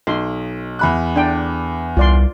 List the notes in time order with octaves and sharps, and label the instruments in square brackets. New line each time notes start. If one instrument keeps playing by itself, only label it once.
[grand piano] B1 [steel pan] C6
[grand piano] E2 B5 F#6
[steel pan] D4 G5
[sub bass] C2 [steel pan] F4 D5 C6